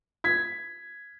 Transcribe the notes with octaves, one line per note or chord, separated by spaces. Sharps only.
G#6 B6